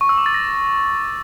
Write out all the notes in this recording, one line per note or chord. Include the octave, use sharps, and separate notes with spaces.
C#6
E6
D6
A6
A#6